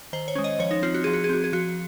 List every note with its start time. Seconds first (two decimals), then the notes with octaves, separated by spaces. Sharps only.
0.13 D#3 C5
0.28 C#5
0.35 G#3 C#4
0.44 D#5
0.59 F3 C#5
0.71 D#4
0.82 C4 F4
0.94 F#4
1.04 F3 G#4
1.13 F#4
1.24 G#4
1.29 C4 F#4
1.44 G#4
1.53 F3 F#4